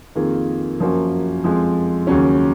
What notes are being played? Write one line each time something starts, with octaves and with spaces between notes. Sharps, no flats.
F2 D#3 A#3 F4 G#4
F#2 F3 A#3 C#4 F#4
F2 F3 G#3
D#2 C#3 F#3 C#4